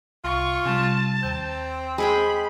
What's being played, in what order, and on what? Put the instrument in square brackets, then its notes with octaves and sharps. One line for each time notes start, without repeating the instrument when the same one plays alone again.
[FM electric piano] C2 [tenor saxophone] F4 [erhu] C#6
[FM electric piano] C3 G3 [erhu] A5
[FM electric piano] D#2 G6 [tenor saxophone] C4
[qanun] G#3 G#4 G5 [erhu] B5